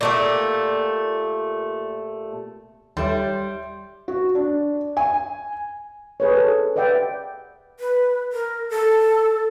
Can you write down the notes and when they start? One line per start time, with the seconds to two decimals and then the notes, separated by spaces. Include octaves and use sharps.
0.01 A#2 A3 G4
2.97 D#2 G3 A4 C#5 E5 C6 E7
4.08 F#4
4.35 D4
4.97 G#5
6.20 G#4 B4 C#5
6.36 A4
6.76 B4 D5 E5 F#5 G5
7.80 B4
8.33 A#4
8.70 A4